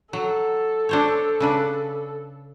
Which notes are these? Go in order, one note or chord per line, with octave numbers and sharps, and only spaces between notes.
F#3 A4
D4 C5 C#5
C#3 D4 B4